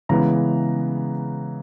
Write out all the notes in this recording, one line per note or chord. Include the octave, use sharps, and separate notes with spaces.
C#3 E3 G#3 B3 A#5